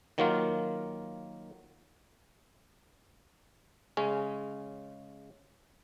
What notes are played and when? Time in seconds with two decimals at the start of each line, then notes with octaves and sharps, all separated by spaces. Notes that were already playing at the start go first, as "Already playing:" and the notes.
0.18 D#3 F#3 A#3 F4
3.97 C#3 G#3 C#4